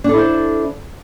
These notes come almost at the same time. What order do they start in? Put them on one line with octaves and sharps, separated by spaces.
D4 A4 E4 C5